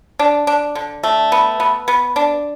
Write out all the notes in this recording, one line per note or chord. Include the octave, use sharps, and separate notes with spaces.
D4
D4
D3
A3
B3
B3
B3
D4